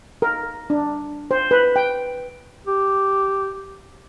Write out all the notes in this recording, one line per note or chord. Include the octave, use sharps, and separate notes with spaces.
A#4
D4
C5
B4
G5
G4